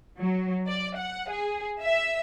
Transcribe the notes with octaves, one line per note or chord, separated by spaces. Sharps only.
F#3
D5
F#5
G#4
E5